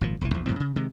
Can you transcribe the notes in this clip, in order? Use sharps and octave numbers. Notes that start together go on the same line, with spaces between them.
G#1 A#2 F3
E1 C2 D#3 E3
A#1 E2 F3
F#2 A2 F3 C4
C#3
C3 D#3 G#3